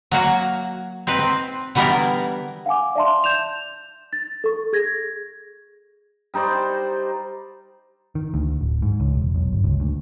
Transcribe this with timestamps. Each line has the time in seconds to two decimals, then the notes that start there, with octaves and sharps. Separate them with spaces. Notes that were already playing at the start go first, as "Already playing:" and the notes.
0.11 F#3 A#3 F#4
1.07 C4 D#4 B4
1.19 C4
1.75 D3 E3 G3 B3 E4 A#4
2.66 F5 F#5 G#5 D6
2.95 D5 E5 A5 C6
3.24 G6 E7 F7
4.13 A6
4.44 A4 C#6
4.73 G#4 G#6 A#6
6.34 G3 D#4 C5 D5
8.15 D#3
8.34 D2
8.61 D1
8.82 G#2
9.00 C#2
9.15 E1
9.35 B1
9.53 G1
9.64 C#2
9.80 D2